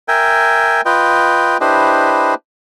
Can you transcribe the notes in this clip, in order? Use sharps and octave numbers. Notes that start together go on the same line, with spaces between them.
A#4 E5 G5 G#5
F4 B4 D#5 G5
D4 E4 G4 B4 C5 D#5